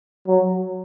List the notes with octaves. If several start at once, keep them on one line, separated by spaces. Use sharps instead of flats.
F#3